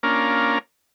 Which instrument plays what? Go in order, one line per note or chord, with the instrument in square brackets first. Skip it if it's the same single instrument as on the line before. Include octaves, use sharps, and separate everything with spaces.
[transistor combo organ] A#3 C#4 D4 F4 A#4